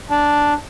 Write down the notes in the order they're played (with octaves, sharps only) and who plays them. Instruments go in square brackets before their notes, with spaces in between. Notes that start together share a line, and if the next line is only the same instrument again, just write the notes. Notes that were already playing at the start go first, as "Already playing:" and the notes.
[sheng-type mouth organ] D4